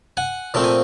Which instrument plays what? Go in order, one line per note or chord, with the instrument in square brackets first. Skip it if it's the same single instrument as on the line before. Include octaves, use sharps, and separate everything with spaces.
[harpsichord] F#5 G#5
A#2 F3 A3 C4 A5
G#5